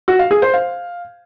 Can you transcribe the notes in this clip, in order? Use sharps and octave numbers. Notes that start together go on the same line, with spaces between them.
F#4
F5
G#4
C5
F5